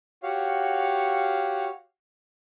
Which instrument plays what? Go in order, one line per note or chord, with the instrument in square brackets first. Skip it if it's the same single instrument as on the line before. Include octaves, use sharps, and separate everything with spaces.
[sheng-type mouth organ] F#4 G4 C#5 F5